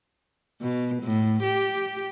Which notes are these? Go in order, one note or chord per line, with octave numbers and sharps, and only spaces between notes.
B2
A2
G4